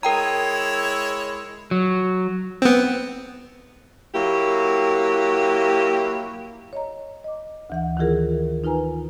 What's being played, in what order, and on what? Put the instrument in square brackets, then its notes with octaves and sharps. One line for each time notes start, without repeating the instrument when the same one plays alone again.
[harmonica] G#3 E4 C#5 [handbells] A#4 G5 A#5
[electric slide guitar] F#3
[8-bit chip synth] B3 C4
[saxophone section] F#3 A#3 E4 G4
[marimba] C#5 D#5 A#5
D#5 D6
D2 E3 F#5
D#3 E3 E4 F4 G#4 A#4
D#4 F4 B4 G#5 A#5